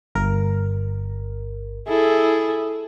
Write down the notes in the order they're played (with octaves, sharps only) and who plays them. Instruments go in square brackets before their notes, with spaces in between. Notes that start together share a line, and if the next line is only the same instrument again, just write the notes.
[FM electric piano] G1 A#4
[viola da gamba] E4 G#4 A4